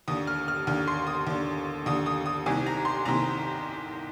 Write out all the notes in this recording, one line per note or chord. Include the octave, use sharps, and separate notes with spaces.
D#2 D3 D#6
F6
F6
D#2 D3 F6
C6
D#6
D#2 D3
D#2 D3 D#6
D#6
D#6
C2 C3 D#3 G#5
A#5
C6
C2 C3 D#3 A#5